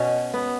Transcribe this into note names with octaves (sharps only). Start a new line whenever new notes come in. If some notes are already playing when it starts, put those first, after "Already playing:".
Already playing: B2 C#4
B3